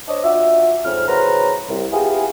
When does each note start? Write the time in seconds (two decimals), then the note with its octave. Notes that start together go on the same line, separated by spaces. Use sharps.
0.08 D4 C5 C#5 D#5
0.24 D4 F4 F#4 E5
0.84 F2 G#2 C#3 F6
1.08 A2 C#3 F#3 B4 C5 A#5
1.69 C2
1.92 B3 E4 F4 G4 G#4